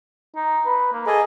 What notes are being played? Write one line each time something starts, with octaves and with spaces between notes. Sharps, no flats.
D#4
B4
A#3
G#4 A4 D#5